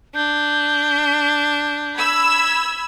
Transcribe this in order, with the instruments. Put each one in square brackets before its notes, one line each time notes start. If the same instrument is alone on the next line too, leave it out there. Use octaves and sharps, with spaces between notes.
[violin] D4 [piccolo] G6
[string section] B5 E6 G#6